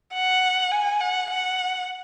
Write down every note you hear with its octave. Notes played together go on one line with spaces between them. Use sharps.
F#5
G#5
F#5
F#5